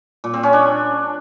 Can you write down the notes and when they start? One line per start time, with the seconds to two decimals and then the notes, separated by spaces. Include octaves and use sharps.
0.24 A#2
0.34 C4
0.43 C#4
0.53 D4